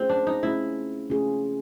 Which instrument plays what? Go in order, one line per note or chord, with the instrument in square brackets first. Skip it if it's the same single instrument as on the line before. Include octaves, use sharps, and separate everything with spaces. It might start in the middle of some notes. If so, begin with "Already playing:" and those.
Already playing: [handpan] A3 C#4 F4 G#4 [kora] C4
[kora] D4
D#4
[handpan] A3 C#4 F4 G#4 [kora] E4
[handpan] A3 C#4 F4 G#4